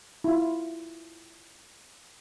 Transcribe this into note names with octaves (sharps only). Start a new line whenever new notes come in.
E4 F4